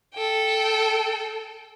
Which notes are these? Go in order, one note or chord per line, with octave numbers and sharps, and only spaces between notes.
A4 G5